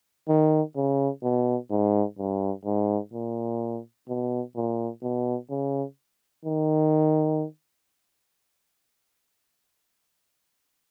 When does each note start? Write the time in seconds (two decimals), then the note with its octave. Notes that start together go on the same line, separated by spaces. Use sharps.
0.28 D#3
0.76 C#3
1.23 B2
1.70 G#2
2.18 G2
2.65 G#2
3.13 A#2
4.08 B2
4.56 A#2
5.03 B2
5.50 C#3
6.45 D#3